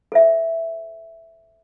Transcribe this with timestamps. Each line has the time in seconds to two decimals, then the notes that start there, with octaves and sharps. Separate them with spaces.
0.12 A4 C5 E5